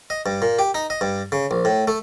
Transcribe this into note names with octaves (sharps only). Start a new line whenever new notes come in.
D#5
G2
A#2
G4
D#4
D#5
G2
C#3
A#1
A2
A3